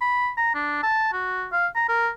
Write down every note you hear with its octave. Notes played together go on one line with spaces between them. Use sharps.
B5
A#5
D4
A5
F#4
F5
A#5
A#4